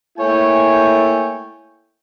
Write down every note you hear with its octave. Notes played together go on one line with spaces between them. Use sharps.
A3 A#3 E4 C#5 G5 G#5